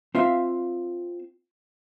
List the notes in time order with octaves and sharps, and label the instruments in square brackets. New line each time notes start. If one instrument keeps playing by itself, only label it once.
[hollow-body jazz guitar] C4 F4 E5 F5